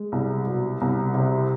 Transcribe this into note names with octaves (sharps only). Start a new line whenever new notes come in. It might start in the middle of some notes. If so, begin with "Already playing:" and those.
Already playing: G#3
C2
B2
C2
C3